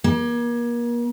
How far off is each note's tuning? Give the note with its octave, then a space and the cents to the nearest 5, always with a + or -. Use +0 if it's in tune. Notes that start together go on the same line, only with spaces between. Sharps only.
A#3 +35